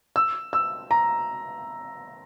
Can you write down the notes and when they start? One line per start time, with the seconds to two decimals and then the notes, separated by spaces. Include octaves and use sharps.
0.16 E6
0.53 E6
0.91 A#5